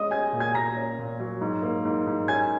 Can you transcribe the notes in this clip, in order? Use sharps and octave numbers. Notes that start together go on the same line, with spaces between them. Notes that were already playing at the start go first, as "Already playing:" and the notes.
Already playing: G#3 C#4 D#5 D#6
C#4 G#5 G#6
A#2
G#5 G#6
A#2 A#5 A#6
C#4
A#2
F#3
G#2
A#3
G#2
G#2
C#4 G#5 G#6